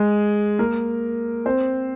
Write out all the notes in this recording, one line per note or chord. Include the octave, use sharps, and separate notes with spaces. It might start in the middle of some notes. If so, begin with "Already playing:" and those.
Already playing: G#3 G#4
A#3 A#4
C4 C5